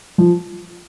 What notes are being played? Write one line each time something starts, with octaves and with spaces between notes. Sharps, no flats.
F3